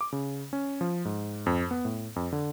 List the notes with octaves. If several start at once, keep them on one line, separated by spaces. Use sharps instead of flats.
D6
C#3
C#4
F3
G#2
F2
B3
A2
F2
D3